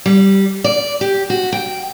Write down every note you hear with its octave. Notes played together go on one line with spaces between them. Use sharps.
G3
D5
G4
F#4
G5